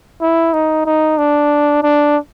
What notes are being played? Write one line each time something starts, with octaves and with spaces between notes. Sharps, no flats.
E4
D#4
D#4
D4
D4